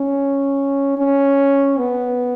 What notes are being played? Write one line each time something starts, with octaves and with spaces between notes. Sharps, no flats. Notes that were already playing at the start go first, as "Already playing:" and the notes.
Already playing: C#4
C#4
B3